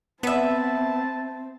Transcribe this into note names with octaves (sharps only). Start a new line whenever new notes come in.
B3 C4 B4 E5 A5